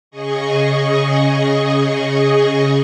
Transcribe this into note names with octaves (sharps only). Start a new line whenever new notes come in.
C#3 G#4 D#5 C#6